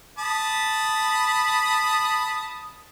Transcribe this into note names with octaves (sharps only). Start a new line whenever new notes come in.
A5 B5 D#6